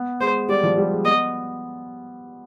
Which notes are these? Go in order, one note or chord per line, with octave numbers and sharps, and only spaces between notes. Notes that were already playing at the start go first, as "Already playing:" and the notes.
Already playing: B3
G#3 C5
G3 D5
F3
G3
G#3
B3 D#5